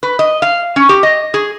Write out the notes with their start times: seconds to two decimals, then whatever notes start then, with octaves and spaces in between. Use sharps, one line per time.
0.03 B4
0.19 D#5
0.42 F5
0.76 C#4
0.89 G4
1.03 D#5
1.34 G#4